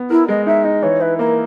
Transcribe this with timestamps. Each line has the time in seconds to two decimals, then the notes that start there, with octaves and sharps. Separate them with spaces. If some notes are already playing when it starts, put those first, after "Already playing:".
Already playing: B3
0.10 E4 A#4
0.28 G#3 D#5
0.46 D#4 E5
0.64 D#4 D#5
0.82 E3 C#5
1.01 E4 B4
1.19 A#3 A#4